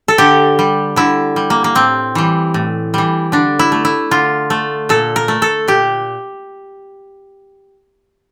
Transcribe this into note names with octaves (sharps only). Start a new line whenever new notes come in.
A4
D3 G4
G3
D3 E4
G3
A#3
A#3
A2 C4
E3 G3
A2
E3 G3
D3 D4
E4
A3
E4
D3 F4
A3
A#2 A4
A#4
A3
A4
A#2 G4